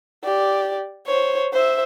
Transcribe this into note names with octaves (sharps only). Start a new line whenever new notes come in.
G4 D5
C5 C#5
C5 E5